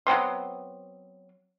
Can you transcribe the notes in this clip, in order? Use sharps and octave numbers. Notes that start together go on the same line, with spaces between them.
F#3 B3 C4 C6